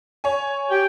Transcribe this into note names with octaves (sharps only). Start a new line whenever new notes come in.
C#5 G#5
G4 G5